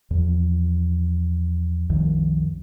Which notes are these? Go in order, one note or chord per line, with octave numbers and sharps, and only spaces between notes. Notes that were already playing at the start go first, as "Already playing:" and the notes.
E2 F3
C2 F#2 D#3 F3